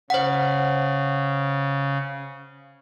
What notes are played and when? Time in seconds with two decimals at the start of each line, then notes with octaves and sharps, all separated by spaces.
0.10 C#3 C5 F#5